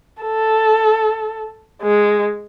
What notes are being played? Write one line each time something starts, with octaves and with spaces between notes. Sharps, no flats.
A4
G#3